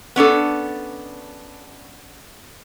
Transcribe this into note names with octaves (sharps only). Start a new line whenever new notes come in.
B3 C#4 D4 A4